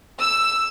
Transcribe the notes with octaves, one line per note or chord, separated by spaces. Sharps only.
E6